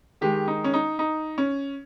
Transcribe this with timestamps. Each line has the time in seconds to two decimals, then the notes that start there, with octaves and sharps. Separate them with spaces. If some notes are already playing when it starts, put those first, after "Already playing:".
0.21 D#3 G#3 G4
0.48 D#4
0.64 C#4
0.73 D#4
0.99 D#4
1.38 C#4